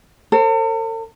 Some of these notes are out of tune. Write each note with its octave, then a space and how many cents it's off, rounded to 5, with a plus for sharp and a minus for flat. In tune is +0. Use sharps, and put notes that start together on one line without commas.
A4 +45 C5 +30